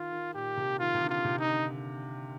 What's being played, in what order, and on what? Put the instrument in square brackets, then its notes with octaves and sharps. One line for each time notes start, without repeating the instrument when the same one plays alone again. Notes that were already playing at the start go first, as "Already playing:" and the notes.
Already playing: [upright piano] D#3 [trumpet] F4
[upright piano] D#3
[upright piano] A#2 [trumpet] G4
[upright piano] C3
[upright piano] D#3 [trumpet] F4
[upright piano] C3
D3
[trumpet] F4
[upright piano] C3
[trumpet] D#4
[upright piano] D3